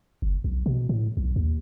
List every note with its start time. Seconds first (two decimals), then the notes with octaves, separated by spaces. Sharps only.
0.22 F#1
0.44 B1
0.66 B2
0.89 A2
1.17 B1
1.36 D#2